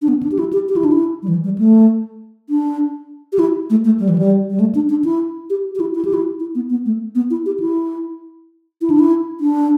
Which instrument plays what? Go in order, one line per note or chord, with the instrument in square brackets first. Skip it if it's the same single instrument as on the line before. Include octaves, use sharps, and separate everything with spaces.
[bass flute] D4
B3
D4
G4
E4
G4
G4
E4
D4
E4
G3
E3
G3
A3
D4
G4
E4
A3
A3
G3
E3
G3
G3
A3
D4
D4
E4
G4
G4
E4
E4
G4
E4
E4
B3
B3
A3
B3
E4
G4
E4
E4
D4
E4
D4